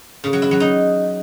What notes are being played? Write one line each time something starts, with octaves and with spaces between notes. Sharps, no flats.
C#3
F#3
E4
F#3
D#4